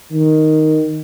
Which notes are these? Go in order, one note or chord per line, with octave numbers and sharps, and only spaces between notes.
D#3